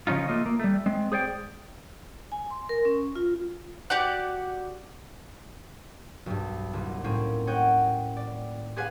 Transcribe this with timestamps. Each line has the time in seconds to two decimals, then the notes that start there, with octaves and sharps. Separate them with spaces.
0.07 C#3 F3 C#4 D#4 F4
0.28 A3 A#3 F4 D#5
0.46 A#3
0.60 G3 A3
0.86 G#3 C4
1.12 G#4 C5 D5 G5
2.32 G#5
2.51 C6
2.69 A#4
2.85 C#4
3.15 F4
3.90 F#4 G4 D5 F#5
6.26 B1 G2
6.73 D#1 C2
7.04 A2 A#3 C4 C#4
7.47 C#5 D#5 F#5 G5
8.17 D5
8.76 G4 G#4 B4 F5 F#5 G#5